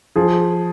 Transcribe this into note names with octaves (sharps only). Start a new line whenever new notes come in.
F3 G#4